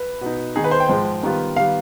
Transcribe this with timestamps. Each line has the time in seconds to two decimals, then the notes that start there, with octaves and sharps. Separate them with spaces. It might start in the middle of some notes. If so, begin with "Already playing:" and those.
Already playing: B4
0.21 B2 B3 D#4
0.56 D#3 B3 D#4 G#4
0.64 B4
0.71 C5
0.80 G5
0.88 G#2 F3 G#3
1.23 D#3 G3 B3 F4
1.56 D#3 G3 B3 F5